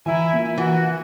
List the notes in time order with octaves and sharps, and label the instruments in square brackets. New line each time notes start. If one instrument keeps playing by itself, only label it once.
[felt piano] E3 A#5 [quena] E4 [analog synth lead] G#5
[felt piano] A#3 F4
[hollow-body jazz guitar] E3 [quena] F#4